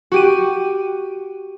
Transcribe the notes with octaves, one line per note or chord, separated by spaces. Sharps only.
F#4 G4 D#7